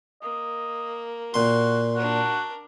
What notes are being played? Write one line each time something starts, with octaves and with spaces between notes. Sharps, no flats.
A#3 D#5
A#2 F#4 C6
D4 F#4 A#4